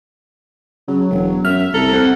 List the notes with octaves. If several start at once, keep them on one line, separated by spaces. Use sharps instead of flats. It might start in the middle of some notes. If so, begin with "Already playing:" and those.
C#3 F#3
E1
F#2 E5 F6
C2 A4 A#5
C4 F#5